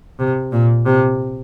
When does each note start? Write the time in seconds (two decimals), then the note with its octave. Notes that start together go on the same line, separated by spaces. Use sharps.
0.19 C3
0.52 A#2
0.86 C3